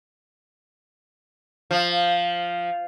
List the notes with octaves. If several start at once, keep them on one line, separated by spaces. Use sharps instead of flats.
F3